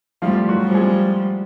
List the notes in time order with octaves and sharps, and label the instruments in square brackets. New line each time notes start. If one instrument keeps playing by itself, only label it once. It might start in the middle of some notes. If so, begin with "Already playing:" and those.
[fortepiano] F3 F4 [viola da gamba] G3 A3
[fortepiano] F#3 F#4
[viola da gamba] F3 G3
[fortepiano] G#3 G#4